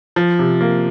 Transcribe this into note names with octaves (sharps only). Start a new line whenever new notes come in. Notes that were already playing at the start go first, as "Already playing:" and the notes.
F3
C3
A#3